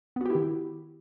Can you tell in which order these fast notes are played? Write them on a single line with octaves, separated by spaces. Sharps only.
B3 F#4 G4 E4 D#3